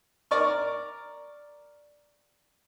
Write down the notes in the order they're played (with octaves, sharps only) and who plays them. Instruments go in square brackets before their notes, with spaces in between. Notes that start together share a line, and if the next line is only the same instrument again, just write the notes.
[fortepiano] A#4 D5 C#6 F6